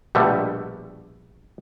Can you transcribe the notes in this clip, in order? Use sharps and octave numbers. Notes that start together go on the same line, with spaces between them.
A#1 B2 D3 G3 A3